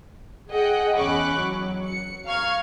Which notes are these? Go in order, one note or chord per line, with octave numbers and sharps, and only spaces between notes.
G#4 D#5 F#5 G5
E2 C#4 B5 C#6 D6 F#6
F#3
C#7
F5 A#5 C#6 F6 G#6